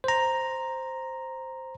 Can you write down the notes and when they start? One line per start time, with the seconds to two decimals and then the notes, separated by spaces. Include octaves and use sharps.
0.04 C5 A#5